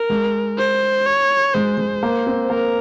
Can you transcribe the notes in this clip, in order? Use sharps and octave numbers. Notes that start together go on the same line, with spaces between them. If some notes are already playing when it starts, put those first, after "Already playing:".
Already playing: A#4
G#3
C5
C#5
G#3 C5
G#3
A#3
C4
A#3 A#4